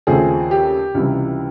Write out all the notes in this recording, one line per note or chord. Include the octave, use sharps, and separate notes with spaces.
D#2 C#3 F3 A3 C4 G#4
G4
C#2 C3 E3 G3